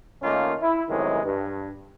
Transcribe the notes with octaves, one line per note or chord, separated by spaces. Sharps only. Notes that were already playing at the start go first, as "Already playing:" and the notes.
D#3 A3 A#3 C#4 D#4 F4
E4
F#2 A2 C3 D#3 E3 G#3
G2